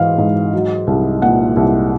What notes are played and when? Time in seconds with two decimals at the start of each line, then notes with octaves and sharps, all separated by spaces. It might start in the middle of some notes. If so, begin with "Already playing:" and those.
Already playing: G#2 E3 F5
0.18 G#2
0.53 F#3
0.87 C2
1.22 A#2 F#5
1.56 C2